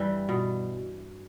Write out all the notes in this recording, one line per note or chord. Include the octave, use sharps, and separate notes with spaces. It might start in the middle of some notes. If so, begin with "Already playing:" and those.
Already playing: G2 E3 G3
B2